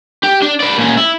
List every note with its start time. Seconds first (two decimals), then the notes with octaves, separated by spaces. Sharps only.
0.23 G4
0.42 D4
0.60 B4 D5
0.78 A#2 C#4
0.97 E4